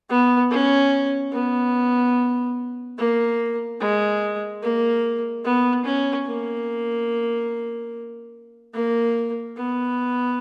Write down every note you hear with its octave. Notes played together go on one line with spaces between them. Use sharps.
B3
C#4
B3
A#3
G#3
A#3
B3
C#4
A#3
A#3
B3